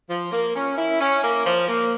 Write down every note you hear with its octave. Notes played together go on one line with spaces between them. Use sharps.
F3
A#3
C#4
E4
C#4
A#3
F3
A#3